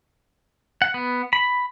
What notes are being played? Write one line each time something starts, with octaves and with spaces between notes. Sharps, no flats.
F#5
B3
B5